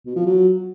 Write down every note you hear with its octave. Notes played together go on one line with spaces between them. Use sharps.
B2
F3
F#3